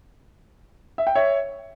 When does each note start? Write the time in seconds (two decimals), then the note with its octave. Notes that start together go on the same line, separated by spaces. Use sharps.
0.98 E5
1.07 G5
1.15 C#5 E5